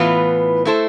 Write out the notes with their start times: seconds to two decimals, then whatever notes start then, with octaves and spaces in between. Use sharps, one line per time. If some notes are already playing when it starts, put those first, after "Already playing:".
Already playing: A2 E3 B3 F4 B4
0.65 A3 E4 A4 C5